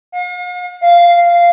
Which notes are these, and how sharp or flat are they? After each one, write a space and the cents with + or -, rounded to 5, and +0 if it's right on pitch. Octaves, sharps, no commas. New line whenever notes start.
F5 +45
F5 -10